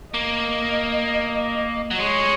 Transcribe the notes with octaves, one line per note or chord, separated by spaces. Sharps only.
A#3 D#5
F#3
G#3 C#5